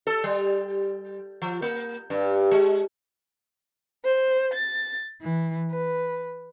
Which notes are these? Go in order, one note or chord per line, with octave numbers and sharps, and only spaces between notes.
A4
G3
F3
A#3
G2
G#3
C5
A6
E3
B4